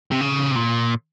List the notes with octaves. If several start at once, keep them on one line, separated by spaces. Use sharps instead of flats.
C3
C#3
C3
A#2